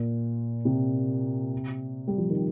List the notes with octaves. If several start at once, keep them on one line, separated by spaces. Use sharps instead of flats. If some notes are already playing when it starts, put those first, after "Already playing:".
Already playing: A#2
C3
G3
F3
D#3